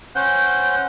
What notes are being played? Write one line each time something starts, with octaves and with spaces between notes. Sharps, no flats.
C#4 C5 F#5 G6